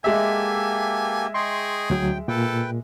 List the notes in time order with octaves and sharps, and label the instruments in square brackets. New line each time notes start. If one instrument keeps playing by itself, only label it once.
[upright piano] G#3 E5 [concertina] A#3 G4 A4 [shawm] G#5
[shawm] G#4 [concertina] D#5 G5 C#6 [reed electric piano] C6
[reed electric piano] D2 F#3 [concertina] G5
[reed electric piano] A#2 [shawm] A4 [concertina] B4 G5